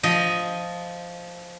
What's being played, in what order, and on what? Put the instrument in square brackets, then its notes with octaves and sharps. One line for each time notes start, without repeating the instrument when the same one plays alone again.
[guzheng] F3 D#5